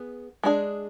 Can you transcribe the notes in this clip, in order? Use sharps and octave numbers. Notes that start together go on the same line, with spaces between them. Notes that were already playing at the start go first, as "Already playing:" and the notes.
Already playing: B3 G#4
G#3 D4 G#4